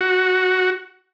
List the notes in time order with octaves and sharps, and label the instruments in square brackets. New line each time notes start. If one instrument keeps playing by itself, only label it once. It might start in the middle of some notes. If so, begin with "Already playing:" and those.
[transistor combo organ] F#4